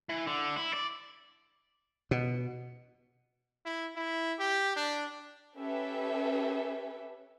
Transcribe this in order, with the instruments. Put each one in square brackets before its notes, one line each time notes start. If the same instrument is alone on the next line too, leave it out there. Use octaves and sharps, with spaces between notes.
[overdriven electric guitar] E3
D3
E4
D5
[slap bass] B2
[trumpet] E4
E4
G4
D4
[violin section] C#4 G4 A4 B4 E5